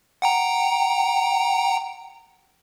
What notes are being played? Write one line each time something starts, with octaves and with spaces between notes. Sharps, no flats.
F#5 G5 A#5